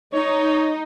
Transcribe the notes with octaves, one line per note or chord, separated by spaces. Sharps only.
D#4 C#5